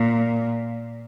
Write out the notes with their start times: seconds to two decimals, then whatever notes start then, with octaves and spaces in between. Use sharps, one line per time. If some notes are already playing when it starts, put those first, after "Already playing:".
Already playing: A#2